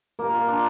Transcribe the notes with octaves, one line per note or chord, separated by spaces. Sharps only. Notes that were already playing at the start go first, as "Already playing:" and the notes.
A#2 A#3 A#4
F4
D4